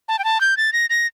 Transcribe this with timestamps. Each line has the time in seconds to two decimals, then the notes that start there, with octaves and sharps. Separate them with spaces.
0.08 A5
0.19 G5
0.24 A5
0.41 G6
0.57 A6
0.73 A#6
0.90 A#6